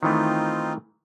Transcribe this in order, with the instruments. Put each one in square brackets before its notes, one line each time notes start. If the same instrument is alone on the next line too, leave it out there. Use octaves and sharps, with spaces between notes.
[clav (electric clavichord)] D#3 E3 A3 [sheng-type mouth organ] C4 D#4 F4